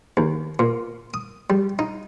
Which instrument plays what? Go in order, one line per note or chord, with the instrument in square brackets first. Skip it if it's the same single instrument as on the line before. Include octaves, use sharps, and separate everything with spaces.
[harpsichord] D#2
A#2
D#6
G3
D#4